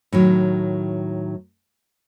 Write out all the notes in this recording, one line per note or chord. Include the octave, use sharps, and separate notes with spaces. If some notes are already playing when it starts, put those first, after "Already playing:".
A2 D#3 F#3